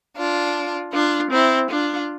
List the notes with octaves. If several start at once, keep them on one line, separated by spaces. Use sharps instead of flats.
D4 F4
D4 F4
C4 E4
D4 F4